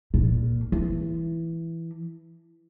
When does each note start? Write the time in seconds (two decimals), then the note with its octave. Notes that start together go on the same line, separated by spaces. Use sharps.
0.14 A#2
0.72 E3